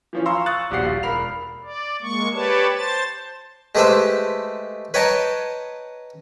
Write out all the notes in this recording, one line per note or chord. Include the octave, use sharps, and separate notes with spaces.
E3 F3 C#4
F5 G#5 A#5 C6 C#6 E6
C#6 D#6 F#6 A6
D#1 A#1 B2 G4 F#5 C7
F4
E1 A#4 B5 C7 F7
D5
G#3 A#3 C#6
G4 B4 C#5 D5 A5
C5 A5 A6
G#3 A3 G4 B4 C5 E5
B4 C#5 D#5 G5 A5 A#5